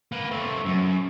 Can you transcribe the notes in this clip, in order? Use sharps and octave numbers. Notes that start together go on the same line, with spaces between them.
A#3 B4
A3 C4
F#2